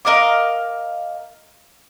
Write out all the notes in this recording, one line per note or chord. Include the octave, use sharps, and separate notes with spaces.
A#4 D#5 F5 D6